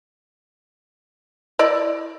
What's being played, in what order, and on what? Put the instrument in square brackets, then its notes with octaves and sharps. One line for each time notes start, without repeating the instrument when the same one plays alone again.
[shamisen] E4 D5 [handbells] D#5